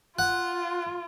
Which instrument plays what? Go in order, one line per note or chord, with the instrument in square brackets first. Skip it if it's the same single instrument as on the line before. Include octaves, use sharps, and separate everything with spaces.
[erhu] F4 [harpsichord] F#5